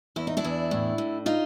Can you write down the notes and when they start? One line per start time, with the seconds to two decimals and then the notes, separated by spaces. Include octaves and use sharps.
0.16 E2 E4
0.27 D#4
0.37 D4 E4
0.44 E2
0.71 A2
0.98 A2
1.26 D#4 F4